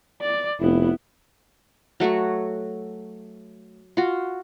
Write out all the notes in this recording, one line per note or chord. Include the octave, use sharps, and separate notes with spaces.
D5
F1 B3 E4
F#3 A3 F#4 C#6
F4 F#4